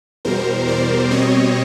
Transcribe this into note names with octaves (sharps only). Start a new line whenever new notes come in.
E2 B2 G3 A#4 C5
C5 D5
B2 G3 C4 C#5 D#5